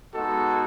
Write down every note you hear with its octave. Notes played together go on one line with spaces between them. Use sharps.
G#3 B3 D#4 F#4 A4